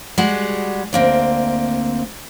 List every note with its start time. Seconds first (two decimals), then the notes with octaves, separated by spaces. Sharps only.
0.18 G3 G#3 F#4 G#4 F#5
0.93 D2 A#3 C4